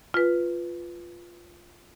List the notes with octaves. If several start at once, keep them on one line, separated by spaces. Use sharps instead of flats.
F4 B4